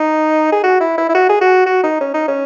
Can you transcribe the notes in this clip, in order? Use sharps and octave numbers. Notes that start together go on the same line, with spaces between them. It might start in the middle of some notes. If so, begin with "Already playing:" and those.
Already playing: D#4
G#4
F#4
E4
E4
E4
F#4
G#4
F#4
F#4
D#4
C#4
D#4
C#4